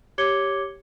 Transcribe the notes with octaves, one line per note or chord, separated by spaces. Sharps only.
G4 C#5 D6 G#6 C#7 G7